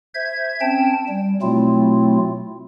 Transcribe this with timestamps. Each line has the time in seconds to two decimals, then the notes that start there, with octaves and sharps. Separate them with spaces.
0.14 C5 E5 G#6
0.61 C4 C#4 G5 A5
1.08 G3
1.42 B2 F#3 A3 C4 E4 F4